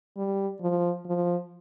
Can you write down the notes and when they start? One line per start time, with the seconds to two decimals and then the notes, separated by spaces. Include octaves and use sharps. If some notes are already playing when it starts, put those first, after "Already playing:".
0.17 G3
0.61 F3
1.06 F3